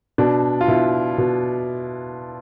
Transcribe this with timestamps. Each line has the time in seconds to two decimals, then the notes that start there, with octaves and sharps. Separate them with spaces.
0.18 B2 D4
0.61 F4
0.68 B2 E4
1.18 B2